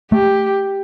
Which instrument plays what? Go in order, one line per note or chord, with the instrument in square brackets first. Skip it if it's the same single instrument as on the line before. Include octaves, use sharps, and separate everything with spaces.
[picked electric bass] A3 [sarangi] G4